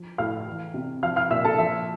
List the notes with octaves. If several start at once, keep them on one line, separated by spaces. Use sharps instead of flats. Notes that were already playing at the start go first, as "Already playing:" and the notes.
Already playing: F3
A2 F5 F6
E3
C3
F3 F5 F6
F5 F6
A#2 E5 E6
A4 A5
F3 E5